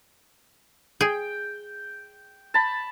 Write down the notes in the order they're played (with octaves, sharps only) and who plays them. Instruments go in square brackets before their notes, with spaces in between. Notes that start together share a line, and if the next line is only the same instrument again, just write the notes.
[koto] G#4 [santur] G5
[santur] A5 B5